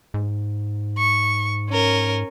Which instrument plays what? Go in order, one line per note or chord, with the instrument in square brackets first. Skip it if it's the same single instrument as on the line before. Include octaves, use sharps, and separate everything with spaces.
[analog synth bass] G#2
[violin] C#6
C#4 A#4